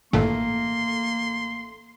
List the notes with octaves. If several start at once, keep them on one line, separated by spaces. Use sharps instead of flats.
A1 G2 A#2 D#3 A3 A#3 C6